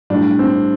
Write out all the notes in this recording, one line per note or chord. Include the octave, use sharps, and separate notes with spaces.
A2 G3 D4
C4